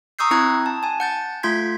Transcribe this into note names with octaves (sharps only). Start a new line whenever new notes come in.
A#5 C#6 D#6 E6 G6 C7
C4 E4 A#5 F#6 G#6
A5
G#5 A5
F#5 G6 A6
A3 F4 C6 G6 G#6 B6